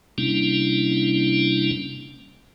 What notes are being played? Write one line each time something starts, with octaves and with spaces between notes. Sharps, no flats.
C3 G3 A#3 C#4 D4 E4